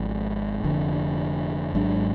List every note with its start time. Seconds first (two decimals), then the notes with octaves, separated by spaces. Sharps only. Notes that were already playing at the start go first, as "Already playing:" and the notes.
Already playing: G#1 G#2 F3
0.63 F1 F2 D3
1.74 G#1 G#2 F#3 D4